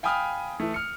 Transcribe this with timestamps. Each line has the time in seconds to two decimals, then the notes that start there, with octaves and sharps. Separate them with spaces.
0.03 F5 G5 G#5 B5 D#6 F6
0.60 E3 A3
0.74 F6 C#7